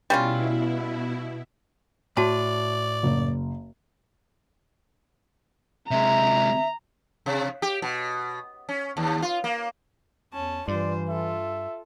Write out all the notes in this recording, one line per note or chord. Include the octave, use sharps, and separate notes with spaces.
B2 G3 C#4 E4 F4
A2 F#4 D5 A5
F#1
C3 G#3 E5 A#5
C3
G4
B2
C#4
D#2
F4
A#3
E2 C#4 A5
G2 E3 F4 C5 D5
F4 A4 E5